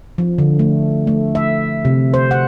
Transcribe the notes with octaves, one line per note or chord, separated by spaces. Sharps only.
F3
D3
A3
A3
E5
C3
C5
F#5